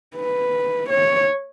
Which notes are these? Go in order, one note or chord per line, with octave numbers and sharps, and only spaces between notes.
B4
C#5